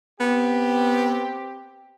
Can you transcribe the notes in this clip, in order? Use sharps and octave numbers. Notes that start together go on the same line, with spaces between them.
B3 C4 G4